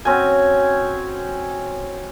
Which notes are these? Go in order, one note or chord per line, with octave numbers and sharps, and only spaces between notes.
C4 C#4 F#4 G#5